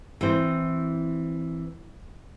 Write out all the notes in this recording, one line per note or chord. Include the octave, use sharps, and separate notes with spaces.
E3 C4 C5